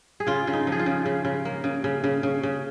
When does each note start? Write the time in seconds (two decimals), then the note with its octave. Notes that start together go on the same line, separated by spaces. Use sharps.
0.20 G#4
0.27 C#3 F4
0.47 C#3
0.53 D#4
0.67 F3
0.72 G#4
0.79 F4
0.86 C#3
1.06 C#3
1.25 C#3
1.45 A#3
1.64 C#3
1.84 C#3
2.04 C#3
2.23 C#3
2.43 C#3